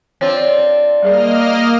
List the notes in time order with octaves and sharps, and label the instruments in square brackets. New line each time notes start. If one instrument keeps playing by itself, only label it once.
[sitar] C4 D4 F4 [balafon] C#5
[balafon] G3 G#4 D5 [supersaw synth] A#3 D#5 F6